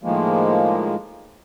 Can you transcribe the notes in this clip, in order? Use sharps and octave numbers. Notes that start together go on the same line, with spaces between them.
A2 D#3 F3 G#3 A#3